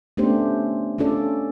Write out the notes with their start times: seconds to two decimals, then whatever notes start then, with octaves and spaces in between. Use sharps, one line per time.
0.17 A3 B3 C#4 D4 G4 C5
0.98 C#4 D4 F4 A4 D5